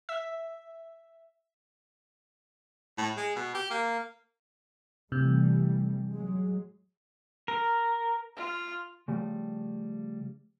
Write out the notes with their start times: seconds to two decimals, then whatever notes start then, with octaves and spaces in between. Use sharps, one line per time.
0.09 E5
2.98 A2
3.16 G#3
3.36 B2
3.55 G4
3.71 A#3
5.12 C3 E3 G3 A3
6.12 F#3 G#3
7.48 A#4
8.36 F4
9.08 C#3 F3 G3 A3